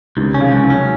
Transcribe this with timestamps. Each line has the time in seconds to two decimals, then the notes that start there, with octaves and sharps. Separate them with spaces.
0.17 C#2 C3 D#3
0.34 C#4
0.40 C#3 F3
0.52 C#2
0.64 D#3 F#3
0.70 C#4